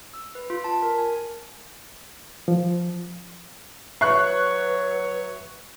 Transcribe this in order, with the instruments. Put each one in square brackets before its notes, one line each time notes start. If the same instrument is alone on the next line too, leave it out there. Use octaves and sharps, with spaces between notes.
[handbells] E6
B4
F4
A5
A#4
G#5
[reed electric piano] F3
[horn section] F#3 C#5 [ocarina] B4 [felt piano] E5 C7 [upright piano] C#6 F#6